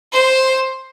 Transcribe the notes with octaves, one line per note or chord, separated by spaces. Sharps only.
C5